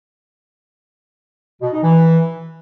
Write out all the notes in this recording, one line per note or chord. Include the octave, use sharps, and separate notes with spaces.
B2
D#4
E3